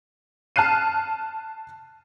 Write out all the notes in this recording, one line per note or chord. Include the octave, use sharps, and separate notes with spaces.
A5 F6 F#6 C7 D#7